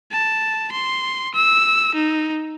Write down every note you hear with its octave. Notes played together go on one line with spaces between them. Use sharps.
A5
C6
E6
D#4